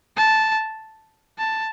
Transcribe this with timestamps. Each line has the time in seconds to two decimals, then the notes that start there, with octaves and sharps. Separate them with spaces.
0.17 A5
1.39 A5